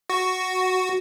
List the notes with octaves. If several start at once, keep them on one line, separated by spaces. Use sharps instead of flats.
F#4